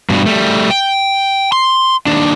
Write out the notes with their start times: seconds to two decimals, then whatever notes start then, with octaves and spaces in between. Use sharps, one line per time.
0.10 G2 B2
0.26 G3 A3
0.70 G5
1.52 C6
2.07 D#2 D4